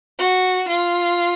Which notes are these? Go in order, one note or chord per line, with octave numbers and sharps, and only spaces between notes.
F#4
F4